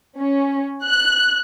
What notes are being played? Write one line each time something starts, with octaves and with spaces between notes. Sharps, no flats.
C#4
F#6